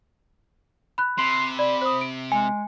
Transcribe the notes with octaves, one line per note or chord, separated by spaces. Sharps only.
B5 F#6
C3 C6
D5 B5
C5 D#6
D7
G#3 G#5